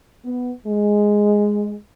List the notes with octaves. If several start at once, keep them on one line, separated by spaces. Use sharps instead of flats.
B3
G#3